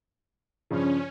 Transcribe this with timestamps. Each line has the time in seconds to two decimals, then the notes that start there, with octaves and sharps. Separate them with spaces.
0.71 G2 C#3 F3 C#4